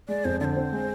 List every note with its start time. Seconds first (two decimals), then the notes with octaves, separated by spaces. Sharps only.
0.08 G#3 D5
0.25 F2 C5
0.40 D3 C5 D5
0.57 C4
0.72 G#3